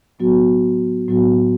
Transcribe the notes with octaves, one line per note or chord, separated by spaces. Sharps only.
A2 F#3 B3 F#4
A2 F#3 B3 F#4